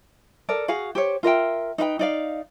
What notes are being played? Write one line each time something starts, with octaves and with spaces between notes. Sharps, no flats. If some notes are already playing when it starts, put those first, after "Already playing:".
A4 A#4 D5
F#4 G#4 F5
G4 C5 C#5
F4 A#4 E5 G5
D#4 B4 F5 G5
D#4 D5 F5